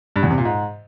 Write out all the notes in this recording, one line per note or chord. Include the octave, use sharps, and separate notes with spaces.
G2
E2
C3
A#2
G#2